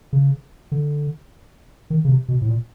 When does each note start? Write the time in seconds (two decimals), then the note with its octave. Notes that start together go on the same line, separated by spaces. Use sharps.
0.13 C#3
0.72 D3
1.90 D#3
2.05 C#3
2.09 C3
2.28 B2
2.41 A2
2.49 A#2